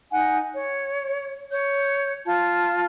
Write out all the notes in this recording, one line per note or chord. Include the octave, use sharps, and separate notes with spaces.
D#4 F#5 G#5
C#5
C#5 G6
F4 A5